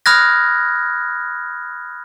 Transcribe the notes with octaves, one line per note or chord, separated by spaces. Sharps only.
B5 D#6 F6 F#6 G#6 A#6